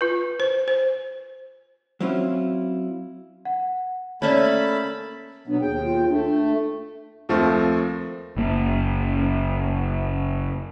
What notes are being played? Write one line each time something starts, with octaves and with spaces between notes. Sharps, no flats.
F4 B4
C5
C5
F#3 C4 C#4 E4 F4
F#5
A3 A#3 C#4 C#5 D5 E5 A5 B5
B2 F#3 B3 D4
D#2 G#4 G5
F4
A3 D4
D4
D#2 F3 A3 C4
F#1 A#3